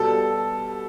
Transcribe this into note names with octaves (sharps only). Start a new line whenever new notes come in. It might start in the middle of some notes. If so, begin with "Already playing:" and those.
Already playing: B2 G3 A4